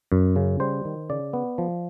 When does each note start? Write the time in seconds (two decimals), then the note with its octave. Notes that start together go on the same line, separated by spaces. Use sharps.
0.12 F#2
0.36 C#3
0.60 G3 C5
0.85 D#3
1.10 C#3 D5
1.33 B3
1.58 F3